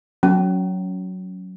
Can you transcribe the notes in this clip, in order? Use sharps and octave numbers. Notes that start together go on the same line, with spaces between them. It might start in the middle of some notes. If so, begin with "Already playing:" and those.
F#3 C#4